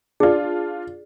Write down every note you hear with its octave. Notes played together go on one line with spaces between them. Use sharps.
D4 F4 G#4 D5